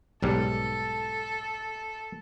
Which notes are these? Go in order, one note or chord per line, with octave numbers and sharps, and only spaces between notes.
B1 G#2 G3 A4